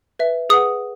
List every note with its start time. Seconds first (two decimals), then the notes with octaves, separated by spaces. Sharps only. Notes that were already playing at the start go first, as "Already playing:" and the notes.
0.19 B4 E5
0.50 G#4 B4 F#5 D#6